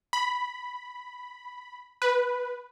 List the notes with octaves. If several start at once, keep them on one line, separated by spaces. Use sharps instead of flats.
B5
B4